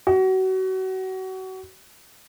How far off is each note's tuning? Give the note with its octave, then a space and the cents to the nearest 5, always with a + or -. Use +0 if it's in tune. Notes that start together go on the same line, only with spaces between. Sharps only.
F#4 +30